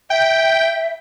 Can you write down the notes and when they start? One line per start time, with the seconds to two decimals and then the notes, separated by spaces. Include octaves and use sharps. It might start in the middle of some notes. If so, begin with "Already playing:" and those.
0.10 E5 G5